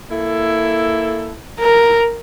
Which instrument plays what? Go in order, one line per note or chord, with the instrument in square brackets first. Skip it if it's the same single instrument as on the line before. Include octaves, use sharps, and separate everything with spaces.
[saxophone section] A#3 E4 A4
[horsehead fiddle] A#4